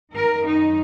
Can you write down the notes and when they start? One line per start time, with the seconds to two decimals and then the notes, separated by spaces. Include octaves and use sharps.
0.14 F#2 D#3 A#4
0.44 D#4